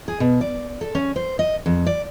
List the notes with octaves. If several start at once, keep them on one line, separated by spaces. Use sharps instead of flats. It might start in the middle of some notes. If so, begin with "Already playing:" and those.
G#4
B2
D5
A4
C#4
C5
D#5
F2
D5